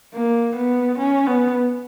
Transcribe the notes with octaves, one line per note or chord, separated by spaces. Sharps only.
A#3
B3
C#4
B3